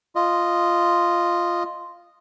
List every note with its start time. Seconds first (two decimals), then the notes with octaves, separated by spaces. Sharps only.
0.15 F4 D#5